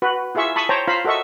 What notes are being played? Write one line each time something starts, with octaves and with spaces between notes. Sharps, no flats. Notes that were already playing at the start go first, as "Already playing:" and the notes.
F#4 B4
E4 F4 G#4 E5 C#6
A5 B5 C#6 D#6
C5 C#5 G5 A5 A#5
F4 C5 F5 A#5 B5
F#4 A4 A#4 D#5 E5 C#6